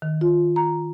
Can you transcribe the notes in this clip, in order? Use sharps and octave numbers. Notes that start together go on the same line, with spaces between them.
D#3
F4
A#5